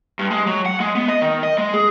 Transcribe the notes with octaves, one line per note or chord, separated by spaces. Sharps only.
G2
G#3
F#3
F#5
G#3
B3
D#5
D#3
D#5
G#3
G#4